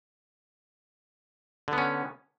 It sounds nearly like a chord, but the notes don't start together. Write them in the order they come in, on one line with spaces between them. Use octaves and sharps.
D3 B3 C#4